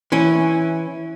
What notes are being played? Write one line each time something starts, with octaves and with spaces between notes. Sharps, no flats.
E3 C#4